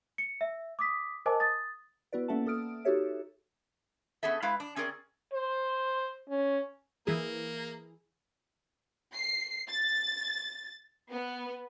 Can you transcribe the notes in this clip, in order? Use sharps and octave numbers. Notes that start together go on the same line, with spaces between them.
C#7
E5
D6 D#6 B6
A#4 C5 D#5 G#5 A5 D6
D#6 A6
B3 E4 F#4 B4 D5
A#3 C#4 A4 E5 F#5 A5
A#3 A4 D#6 F6 D7
D#4 F#4 G4 A4 C#5 E5
B3 C#4 G#4 A4 E5
G#3 E4 B4 F5
D4
C4 C#4 G#4 A#4 D5
C5
C#4
E3 A#3 E4 G#4
C7
A6
B3